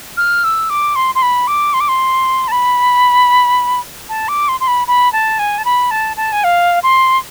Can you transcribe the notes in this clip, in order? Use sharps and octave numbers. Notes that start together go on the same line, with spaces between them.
F6
E6
D6
C6
C6
B5
D6
C6
D6
C6
A5
B5
A5
D6
C6
C6
B5
B5
A5
G#5
A5
B5
A5
A5
G#5
F5
C6